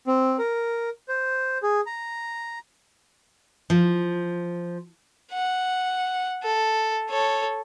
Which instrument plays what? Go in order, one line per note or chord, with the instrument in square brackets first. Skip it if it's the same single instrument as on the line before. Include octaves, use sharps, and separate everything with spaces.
[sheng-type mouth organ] C4
A#4
C5
G#4
A#5
[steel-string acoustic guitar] F3
[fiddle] F#5
A4
A4 C#5